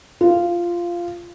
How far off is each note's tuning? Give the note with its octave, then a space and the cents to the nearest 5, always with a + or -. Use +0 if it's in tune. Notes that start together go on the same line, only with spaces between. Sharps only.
F4 -10